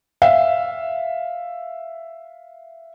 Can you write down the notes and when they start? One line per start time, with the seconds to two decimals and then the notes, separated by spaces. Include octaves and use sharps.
0.22 E5 F5